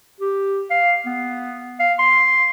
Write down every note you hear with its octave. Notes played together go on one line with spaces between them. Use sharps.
G4
F5
B3
F5
C6